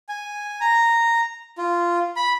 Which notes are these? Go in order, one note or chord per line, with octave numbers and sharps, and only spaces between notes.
G#5
A#5
F4
B5